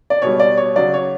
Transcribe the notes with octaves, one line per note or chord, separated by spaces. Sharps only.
D5
B2 G3 C#5
D5
C#5
C#3 F#3 D5
C#5